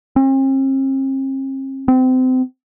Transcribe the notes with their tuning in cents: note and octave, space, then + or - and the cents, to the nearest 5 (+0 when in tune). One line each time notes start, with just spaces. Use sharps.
C4 +45
C4 -30